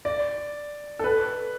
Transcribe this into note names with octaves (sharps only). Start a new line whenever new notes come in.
D5
A4
B4